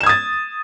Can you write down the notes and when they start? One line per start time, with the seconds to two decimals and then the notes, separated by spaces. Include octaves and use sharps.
0.01 E7
0.03 G#6
0.06 D#6
0.09 A6